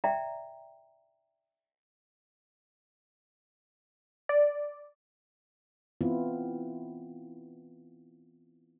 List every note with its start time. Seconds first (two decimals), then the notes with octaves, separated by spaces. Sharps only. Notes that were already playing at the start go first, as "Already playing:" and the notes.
0.04 D5 E5 G5 A#5
4.29 D5
6.01 E3 B3 C4 E4 F4